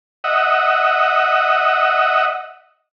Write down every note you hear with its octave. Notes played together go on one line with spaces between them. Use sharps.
D#5 E5 F#5